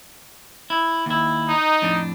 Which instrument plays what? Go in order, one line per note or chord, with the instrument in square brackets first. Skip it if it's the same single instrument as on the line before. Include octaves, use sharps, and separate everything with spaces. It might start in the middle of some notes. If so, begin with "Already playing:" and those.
[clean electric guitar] E4
D#2 E4
[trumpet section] D#4
[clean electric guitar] F2 A2 D4